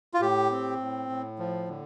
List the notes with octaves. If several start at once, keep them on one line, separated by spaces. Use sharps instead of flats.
F4
A2 G4
C4
A2
A2
F3
D3